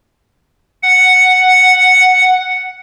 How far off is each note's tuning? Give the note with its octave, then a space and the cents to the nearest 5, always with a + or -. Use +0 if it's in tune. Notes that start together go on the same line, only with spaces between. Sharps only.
F#5 +0